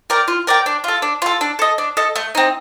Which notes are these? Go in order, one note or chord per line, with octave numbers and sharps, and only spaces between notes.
A#4 D5 G5
F4
A#4 D5 G5
D4
F4 A4
D4
F4 A4
D4
A4 D#5
D4
A4 D#5
A3
C4 D#4